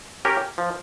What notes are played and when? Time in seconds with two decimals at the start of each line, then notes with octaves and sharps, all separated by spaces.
0.25 C#4 G4 A#4
0.58 F3